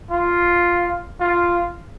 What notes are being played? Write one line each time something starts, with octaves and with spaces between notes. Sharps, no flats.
F4
F4